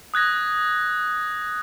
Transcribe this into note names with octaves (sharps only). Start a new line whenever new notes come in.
D#6 F#6 G#6 A#6